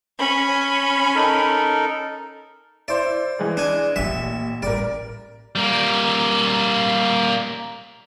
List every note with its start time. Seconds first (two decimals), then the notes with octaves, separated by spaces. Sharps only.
0.18 C#4 B5
1.15 D#4 A4 A#4
2.88 E4 C5 D5
3.39 E3 G#3
3.57 D4 G#5
3.96 A1 A#2 A#3 E5
4.63 A1 G3 A#4 D5
5.56 G3 A#3